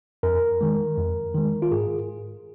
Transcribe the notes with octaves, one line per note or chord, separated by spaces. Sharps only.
F2 A#4
D#3 G#3
F2
D#3 G#3
F4
G#2 G#4